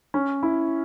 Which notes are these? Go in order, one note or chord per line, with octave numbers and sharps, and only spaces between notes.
C#4
E4